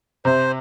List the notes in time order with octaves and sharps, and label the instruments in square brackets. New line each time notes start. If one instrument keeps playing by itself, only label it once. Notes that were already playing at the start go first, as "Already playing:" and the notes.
[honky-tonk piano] C3 [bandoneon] C5